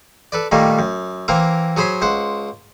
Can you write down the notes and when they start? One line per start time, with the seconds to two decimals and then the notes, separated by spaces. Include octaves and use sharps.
0.32 A4 B4 D5
0.52 A#2 D#3 G3 A3 A#3
0.79 F#2
1.28 E3 A#3 C4 A#4
1.77 F#3 G#4 C5 B5 C6
2.02 C#2 C5 F#5